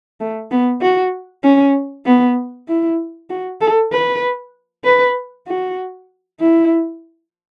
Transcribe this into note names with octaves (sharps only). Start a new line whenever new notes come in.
A3
B3
F#4
C#4
B3
E4
F#4
A4
B4
B4
F#4
E4